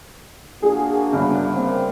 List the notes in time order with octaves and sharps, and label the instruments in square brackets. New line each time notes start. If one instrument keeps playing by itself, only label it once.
[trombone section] A#3 D4 F#4 [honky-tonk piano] G#4
[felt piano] G1 G2 C#3
[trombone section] A#3 C4